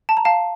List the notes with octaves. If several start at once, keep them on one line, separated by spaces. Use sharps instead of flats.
A5
A#5
F5 A5